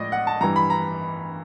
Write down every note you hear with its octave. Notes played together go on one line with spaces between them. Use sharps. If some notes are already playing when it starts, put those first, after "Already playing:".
Already playing: A2 F3 G#3 D5 D#5
F#5
A5
G2 E3 G3 A#5
B5
A#5